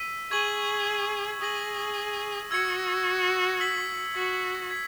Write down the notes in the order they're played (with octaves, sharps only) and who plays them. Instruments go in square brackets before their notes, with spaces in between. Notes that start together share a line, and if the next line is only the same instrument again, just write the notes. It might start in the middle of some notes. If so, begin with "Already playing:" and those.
Already playing: [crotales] E6 B6 D#7
[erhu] G#4 [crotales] C#6 G#6 D#7 F#7
[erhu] G#4 [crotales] D#6 A#6 D#7 F#7
[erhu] F#4 [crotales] E6 G#6 C#7
[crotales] E6 B6 F#7
[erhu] F#4
[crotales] G#6 B6